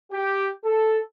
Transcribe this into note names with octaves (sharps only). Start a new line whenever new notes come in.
G4
A4